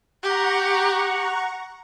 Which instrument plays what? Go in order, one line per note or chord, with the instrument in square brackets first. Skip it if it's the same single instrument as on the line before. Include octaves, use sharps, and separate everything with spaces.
[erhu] G4 [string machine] F#5 A#5 C#6